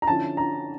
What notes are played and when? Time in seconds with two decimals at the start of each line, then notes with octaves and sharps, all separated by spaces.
0.02 A#5
0.08 D3 F3 C#4 E4 A5
0.37 A#5